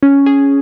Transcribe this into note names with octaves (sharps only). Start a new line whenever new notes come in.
C#4
G#4